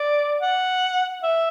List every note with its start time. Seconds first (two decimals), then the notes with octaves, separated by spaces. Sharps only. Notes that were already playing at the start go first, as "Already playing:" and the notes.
Already playing: D5
0.41 F#5
1.23 E5